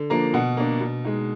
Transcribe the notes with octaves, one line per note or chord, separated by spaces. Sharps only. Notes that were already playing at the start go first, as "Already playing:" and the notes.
Already playing: D3
F3 A#3 D4 A#5
B2 F#5
A#3 D4
B2
G#3 D#4